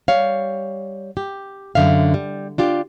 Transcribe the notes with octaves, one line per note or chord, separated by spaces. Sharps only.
G3 C#5 F5
G4
F#2 D3 E5 F5
G3
D4 F4 G4